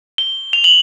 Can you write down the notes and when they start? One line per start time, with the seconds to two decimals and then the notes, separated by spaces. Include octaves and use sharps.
0.18 G7
0.53 F7
0.64 F#7